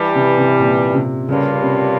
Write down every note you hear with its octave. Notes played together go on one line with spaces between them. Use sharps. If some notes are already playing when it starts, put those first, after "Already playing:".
Already playing: G2 E3 G3
C3
C3
A#2
C3
G2 C#3 G3 A#3 C#4 F4
C3